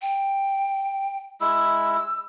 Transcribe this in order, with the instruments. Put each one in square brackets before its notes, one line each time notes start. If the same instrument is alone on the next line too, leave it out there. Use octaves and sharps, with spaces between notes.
[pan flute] G5
[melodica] G#3 E4 [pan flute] E6